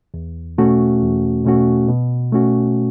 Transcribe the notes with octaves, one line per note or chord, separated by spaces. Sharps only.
E2
B2 A3 C#4 F#4
E2
B2 A3 C#4 F#4
B2
A3 C#4 F#4